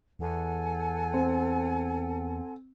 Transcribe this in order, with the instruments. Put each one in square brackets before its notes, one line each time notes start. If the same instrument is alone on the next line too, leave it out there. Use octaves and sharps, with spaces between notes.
[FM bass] E2 [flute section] A4 F#5 G#5
[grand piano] C4